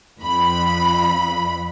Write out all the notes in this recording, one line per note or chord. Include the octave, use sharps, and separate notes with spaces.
F2 B5